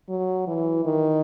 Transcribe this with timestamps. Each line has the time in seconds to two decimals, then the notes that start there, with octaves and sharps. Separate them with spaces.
0.09 F#3
0.47 E3
0.85 D#3